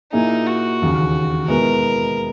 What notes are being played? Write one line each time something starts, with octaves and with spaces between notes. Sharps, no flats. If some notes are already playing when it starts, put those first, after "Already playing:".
A#2 A#3 D#4 E4 G#4
F#4
E1 D#2 C#3
B2 G#3 B3 E4 A#4